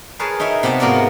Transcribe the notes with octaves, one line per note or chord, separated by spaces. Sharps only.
G#4 A#4 B4 C#5 A5
D#4 A#4 C#5 E5
C3 B3 G5 A5
G#2 A#3 B3 F#4 A#4 D5